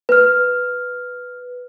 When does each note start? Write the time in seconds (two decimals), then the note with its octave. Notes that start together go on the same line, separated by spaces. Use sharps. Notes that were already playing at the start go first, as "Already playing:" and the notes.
0.09 B4 F6